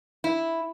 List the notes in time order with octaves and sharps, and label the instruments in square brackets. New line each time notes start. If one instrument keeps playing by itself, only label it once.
[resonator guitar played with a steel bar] E4